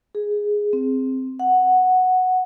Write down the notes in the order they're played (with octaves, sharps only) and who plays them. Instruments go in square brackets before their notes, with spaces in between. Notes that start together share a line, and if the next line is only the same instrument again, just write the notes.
[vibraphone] G#4
C4
F#5